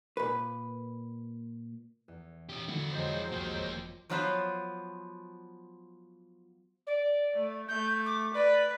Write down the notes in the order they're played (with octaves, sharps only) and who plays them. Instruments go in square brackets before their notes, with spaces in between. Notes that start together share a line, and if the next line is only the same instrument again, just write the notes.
[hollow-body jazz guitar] A#2 B4
[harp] E2
[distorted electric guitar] C#4 G4
[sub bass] D3 [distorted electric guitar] E4 F#4
[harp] F2 F3 D#5 [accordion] F#3 G#3 C5
[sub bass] C2 [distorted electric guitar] A#3 G4 [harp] A5
[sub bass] F#1 [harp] D6 A#6
[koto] F3 F#3 B3 F4 B4 C5
[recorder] D5
[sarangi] A3
[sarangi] A3 [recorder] G6
[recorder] D6
[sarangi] B4 [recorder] D5